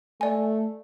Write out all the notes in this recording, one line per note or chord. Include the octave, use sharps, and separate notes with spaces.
A3 D5 G#5